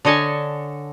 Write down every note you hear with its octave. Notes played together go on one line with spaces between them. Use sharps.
D3 C#5 D#5 G#5 A5